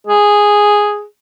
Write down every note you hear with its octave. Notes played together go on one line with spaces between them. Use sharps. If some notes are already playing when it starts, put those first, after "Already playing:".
G#4